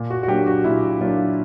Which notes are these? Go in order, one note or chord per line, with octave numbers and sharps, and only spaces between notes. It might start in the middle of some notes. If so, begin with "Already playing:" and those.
Already playing: A#2
F#4
F#4
F#3 A#3 D4 G4
F#4
A#2 E4
F#3 A#3 D4 F4